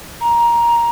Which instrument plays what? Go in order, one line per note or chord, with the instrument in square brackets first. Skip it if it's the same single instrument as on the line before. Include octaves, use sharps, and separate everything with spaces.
[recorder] A#5